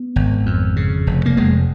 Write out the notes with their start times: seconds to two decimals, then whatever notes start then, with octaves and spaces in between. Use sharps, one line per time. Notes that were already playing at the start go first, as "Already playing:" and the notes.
Already playing: B3
0.16 G#1
0.46 F2
0.76 C#3
1.07 F1
1.26 A#3
1.37 F1 G#3